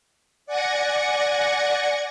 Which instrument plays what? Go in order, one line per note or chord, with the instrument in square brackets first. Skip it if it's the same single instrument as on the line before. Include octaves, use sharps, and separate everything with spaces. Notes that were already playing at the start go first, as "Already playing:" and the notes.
[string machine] D5 F#5 G#5 G#6 A#6 C#7